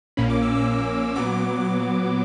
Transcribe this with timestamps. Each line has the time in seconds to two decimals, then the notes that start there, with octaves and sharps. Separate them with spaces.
0.17 A#1 A#2 A#3 C#4 B5
0.30 D6
0.42 E6
0.55 E6
1.16 A#2 F#3 B3 D6
1.65 D6